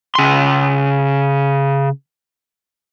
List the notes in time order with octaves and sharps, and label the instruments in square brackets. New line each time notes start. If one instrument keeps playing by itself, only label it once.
[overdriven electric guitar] C#3 C6